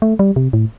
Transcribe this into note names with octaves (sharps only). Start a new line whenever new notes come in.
A3
G3
C3
A2